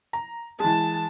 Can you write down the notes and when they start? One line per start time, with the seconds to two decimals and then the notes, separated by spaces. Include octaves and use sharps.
0.13 A#5
0.60 E3 G#3 A5